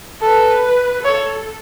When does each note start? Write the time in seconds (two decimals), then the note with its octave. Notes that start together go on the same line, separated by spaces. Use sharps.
0.21 A4 B4
1.05 A4 C#5